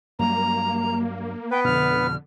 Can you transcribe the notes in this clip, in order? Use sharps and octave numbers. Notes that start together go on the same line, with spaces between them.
G2 F#3 G3 A#3 A#5
B3 B4 G5
F2 B2 D3 F6